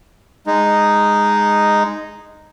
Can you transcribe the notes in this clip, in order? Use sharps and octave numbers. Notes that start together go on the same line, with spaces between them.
G#3 D#4